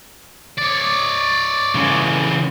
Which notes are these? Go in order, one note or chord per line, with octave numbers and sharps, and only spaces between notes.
C#5 D5
C#3 E3